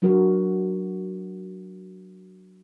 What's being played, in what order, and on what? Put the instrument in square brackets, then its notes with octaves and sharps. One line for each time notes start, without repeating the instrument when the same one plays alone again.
[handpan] F#3 D4 F#4 A#4